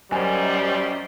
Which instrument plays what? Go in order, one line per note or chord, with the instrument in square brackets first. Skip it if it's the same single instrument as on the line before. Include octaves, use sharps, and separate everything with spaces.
[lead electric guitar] F#2 [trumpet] G3 [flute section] C5 D#5 [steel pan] G#5